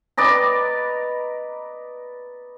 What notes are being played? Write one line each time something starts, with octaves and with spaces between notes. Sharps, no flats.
B4 D5 D#5 A#5